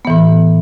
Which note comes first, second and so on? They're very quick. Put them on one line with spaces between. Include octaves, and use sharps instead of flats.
B3 E3 A2